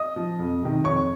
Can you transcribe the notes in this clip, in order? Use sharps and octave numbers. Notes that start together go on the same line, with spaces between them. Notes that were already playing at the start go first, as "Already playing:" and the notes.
Already playing: D#5 D#6
F3
F2
C3 D#3
F2 C#5 C#6